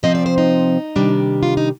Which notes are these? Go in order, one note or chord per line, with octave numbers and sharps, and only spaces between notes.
C3 F3 C4 D#5
D5
C5
D#4
C3 D#3 G3 D4
F4
D#4